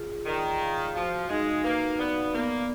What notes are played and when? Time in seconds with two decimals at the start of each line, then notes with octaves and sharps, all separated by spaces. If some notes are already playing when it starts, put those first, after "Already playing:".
Already playing: F4 G#4
0.25 D#3 D5
0.60 F5
0.95 F3 F#4
1.29 G#3 D#4
1.64 A#3 B4
1.99 B3 D5
2.33 A#3 B3